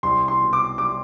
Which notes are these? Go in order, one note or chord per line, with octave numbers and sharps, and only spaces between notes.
C2 C6
C6
B2
D6
G3 D6